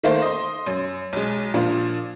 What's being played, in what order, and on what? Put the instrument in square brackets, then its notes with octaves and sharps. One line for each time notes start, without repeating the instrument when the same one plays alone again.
[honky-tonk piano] D#3 A3 A#3 C5
D#5 C6
F#2
B1 G#3
A#2 F3 D4 F4